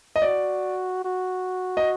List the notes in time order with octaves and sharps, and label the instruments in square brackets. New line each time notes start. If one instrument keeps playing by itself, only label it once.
[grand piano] D#5
[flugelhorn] F#4 [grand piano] D5
[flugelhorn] F#4
[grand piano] D#5